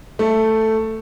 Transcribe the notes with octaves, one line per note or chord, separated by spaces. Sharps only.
A3